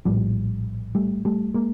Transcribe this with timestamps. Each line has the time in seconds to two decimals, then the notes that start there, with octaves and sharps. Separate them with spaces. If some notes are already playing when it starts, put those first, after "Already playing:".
0.05 A#1 A2 F3 G3
0.95 G3 A3
1.25 G3 A3
1.54 G#3 A#3